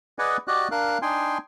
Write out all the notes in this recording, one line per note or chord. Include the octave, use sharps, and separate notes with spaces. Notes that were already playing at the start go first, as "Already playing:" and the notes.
G#4 B4 D5 D#5 F#5 G#5
F#4 G4 D5 D#5 F#6
D4 A#4 F5 F#6
D4 D#4 G5 G#5 C6